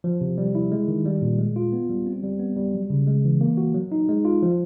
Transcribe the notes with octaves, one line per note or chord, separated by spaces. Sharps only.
F3
C3
G3
E4
G#3
D#3
G3
A#2
G#3
F4
B3
G3
C4
G3
B3
G3
F#3
C#3
G#3
E3
A#3
F#4
F#3
D#4
G#3
F4
F3